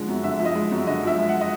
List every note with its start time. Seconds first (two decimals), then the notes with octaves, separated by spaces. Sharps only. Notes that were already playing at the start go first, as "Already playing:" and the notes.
Already playing: D3 F3 G#3
0.08 F#2
0.24 D3 E5
0.39 F3
0.45 D#5
0.55 G#3
0.71 F#2
0.87 D3 D#5
1.03 F3 E5
1.19 G#3
1.29 F#5
1.41 D#5